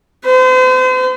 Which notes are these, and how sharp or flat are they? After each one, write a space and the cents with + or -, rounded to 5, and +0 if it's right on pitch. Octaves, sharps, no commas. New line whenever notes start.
C5 -40